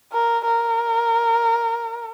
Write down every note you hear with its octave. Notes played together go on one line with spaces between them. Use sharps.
A#4
A#4